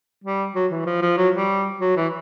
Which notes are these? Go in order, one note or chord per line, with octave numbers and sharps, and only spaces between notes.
G3
F#3
E3
F3
F3
F#3
G3
F#3
E3